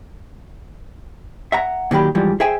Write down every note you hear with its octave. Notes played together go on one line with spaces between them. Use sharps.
E5 F#5 A#5
A#2 D#3 F#3 G4 B5
G#2 E3 F3 G3
G#4 C5 E5 G5 G#5